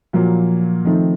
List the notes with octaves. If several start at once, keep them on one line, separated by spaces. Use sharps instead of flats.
A#2 F3 F#3 A#3
D#3 F3 A3 C4 D#4